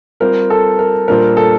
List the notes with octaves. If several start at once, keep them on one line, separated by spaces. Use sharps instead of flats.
G3 C4 F4 A#4 C5
A4
A#4
A#2 G3 D4 F4 A#4 C5
A4